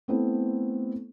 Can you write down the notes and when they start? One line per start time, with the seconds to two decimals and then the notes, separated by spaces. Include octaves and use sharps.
0.08 A3 B3 C4 E4 A4 C5